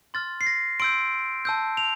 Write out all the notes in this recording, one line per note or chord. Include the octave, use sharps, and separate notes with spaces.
C6 F6 A6
C7
A#6
C6 E6 G6 D7
A5 E6 G6
F7